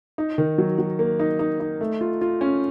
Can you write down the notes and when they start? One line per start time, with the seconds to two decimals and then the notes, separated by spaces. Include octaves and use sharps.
0.18 D#4
0.38 D#3
0.58 F#3
0.78 F#3
0.99 A#3
1.19 D#4
1.39 D#4
1.60 D#4
1.81 A3
2.01 F4
2.21 F4
2.41 C#4